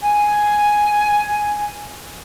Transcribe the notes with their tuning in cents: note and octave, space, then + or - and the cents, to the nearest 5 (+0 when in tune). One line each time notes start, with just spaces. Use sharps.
G#5 +5